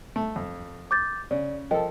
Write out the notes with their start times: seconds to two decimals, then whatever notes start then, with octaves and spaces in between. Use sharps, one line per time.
0.16 A3
0.36 F2
0.91 D6 G6 A6
1.31 C#3 D5
1.71 F3 A4 A#4 D#5 G5